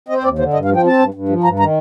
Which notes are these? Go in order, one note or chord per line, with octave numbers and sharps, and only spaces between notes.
C4 D#5
C5
D#2 D5
D3 C5
G2 D#5
F5
F3
G5
C4 A5
G2
G2
F3
G2 A#5
D#3 A#5